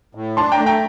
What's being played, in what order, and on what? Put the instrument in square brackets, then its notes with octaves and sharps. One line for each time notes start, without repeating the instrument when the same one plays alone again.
[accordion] A2
[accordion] D4 [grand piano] A5 C6
[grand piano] G5 A#5
[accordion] A3
[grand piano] G5 A#5